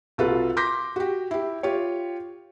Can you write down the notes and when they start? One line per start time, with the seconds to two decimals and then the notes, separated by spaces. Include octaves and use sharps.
0.18 C2 F4 F#4 A4 B4
0.57 C6 D6 G6 A#6 B6
0.96 F#4 G4
1.31 E4 G4
1.63 F4 G4 C#5